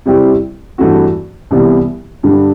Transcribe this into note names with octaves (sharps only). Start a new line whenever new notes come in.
C3 G3 C4 E4 G4
G2 E3 A3 C4 F#4
C2 C3 E3 G3 B3
G2 D3 G3